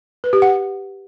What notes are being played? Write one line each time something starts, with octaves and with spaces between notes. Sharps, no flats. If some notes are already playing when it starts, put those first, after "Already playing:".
B4
G4
F#5